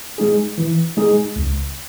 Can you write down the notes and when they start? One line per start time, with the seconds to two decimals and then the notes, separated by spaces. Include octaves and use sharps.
0.18 G#3 D#4 G#4
0.58 E3
0.97 G#3 D#4 G#4
1.36 C#2